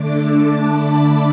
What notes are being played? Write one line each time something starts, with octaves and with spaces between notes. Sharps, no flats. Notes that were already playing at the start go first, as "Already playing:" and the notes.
Already playing: D3 A3 D4 D6
A5
B5